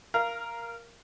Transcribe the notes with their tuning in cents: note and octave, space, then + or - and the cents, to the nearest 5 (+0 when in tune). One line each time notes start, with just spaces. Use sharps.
A#4 +5 F5 -15